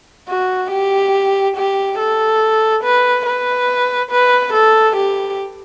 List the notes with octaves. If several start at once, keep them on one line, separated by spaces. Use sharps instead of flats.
F#4
G4
G4
A4
B4
B4
B4
A4
G4